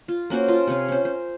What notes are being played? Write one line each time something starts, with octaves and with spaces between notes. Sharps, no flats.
F4
A#3 C#4 F#4 C5
F4 A#4 D#5 A5
C3 C#5 F5 G#5
C#4 C5
C5